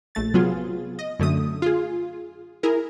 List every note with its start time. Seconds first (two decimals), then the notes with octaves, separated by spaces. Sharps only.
0.15 A#1 A3 A6
0.34 C3 F#3 B3 F4 G#4
0.99 D#5
1.19 F#2 D3 A3 D#6
1.62 F4 G#4
2.63 E4 G#4 A#4